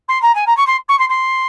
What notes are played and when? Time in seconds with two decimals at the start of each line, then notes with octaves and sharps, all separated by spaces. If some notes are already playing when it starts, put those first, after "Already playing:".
0.08 C6
0.22 A#5
0.35 G#5
0.46 A#5
0.57 C#6
0.67 C6
0.88 C#6
0.99 C6
1.09 C6